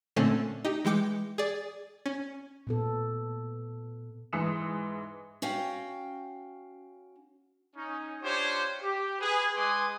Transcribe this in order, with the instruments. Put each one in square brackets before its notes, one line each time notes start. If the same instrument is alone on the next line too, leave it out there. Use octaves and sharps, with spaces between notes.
[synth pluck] A#2 D3 A3 C4 C#4
D#4 G4
E3 G#3 G5 D6 C#7
G#4 D5
C#4
[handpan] A#2 B3 A4
[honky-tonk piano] G#2 E3 D#6 C#7 E7
[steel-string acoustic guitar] C#4 F#4 F5 G5
[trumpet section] C#4 D#4
D4 F4 G4 C5 C#5
G4
G#4 B4
G#3 B4 G#5 C6 D6 D#6